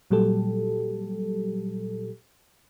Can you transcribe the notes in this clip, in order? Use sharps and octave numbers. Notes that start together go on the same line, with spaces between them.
A#2 F#3 G3 G4 A4